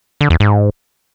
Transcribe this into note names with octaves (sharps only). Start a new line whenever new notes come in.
D3
E2
G#2